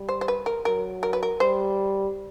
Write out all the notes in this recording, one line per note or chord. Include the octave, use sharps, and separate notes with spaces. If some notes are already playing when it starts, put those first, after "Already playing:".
Already playing: G3
C5
C5
B4
A#4
F#3 A#4
A#4
B4
A#4
G3 C5